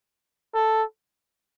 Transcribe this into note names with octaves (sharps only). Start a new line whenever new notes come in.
A4